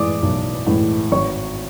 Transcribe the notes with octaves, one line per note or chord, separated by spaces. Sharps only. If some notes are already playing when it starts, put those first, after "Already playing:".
Already playing: A2 E3 G#3 D5 D6 D#6
B1
A2 E3 G#3
G#1 C#5 C#6